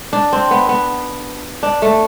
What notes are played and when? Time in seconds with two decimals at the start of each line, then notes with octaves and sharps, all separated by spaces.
0.13 D4
0.33 C4
0.51 B3
0.69 B3
1.63 D4
1.82 A3